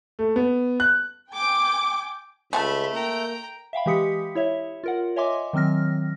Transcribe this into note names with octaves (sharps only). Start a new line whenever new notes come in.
A3
B3
F#6
G5 G#5 D6
C#2 G#3 A3 E5 G#5 A5 B5
A#3 G5 A#5
E5 F5 G5 B5
E3 G#3 G4 D#6 B6 C#7
E4 C#5 E5
F4 A#4 F#5
C#5 D#5 E5 G#5 C6 D6
D#3 F#3 C4 F6 A#6